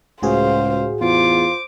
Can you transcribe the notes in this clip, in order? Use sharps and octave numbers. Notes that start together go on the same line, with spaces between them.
C#2 A2 F#4 G#4 C5 F5
E2 F4 C5 D6